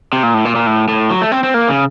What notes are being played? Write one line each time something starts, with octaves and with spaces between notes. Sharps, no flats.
C3
A#2
A2
A#2
A#2
A2
A2
F#3
A3
C4
C4
A#3
C#3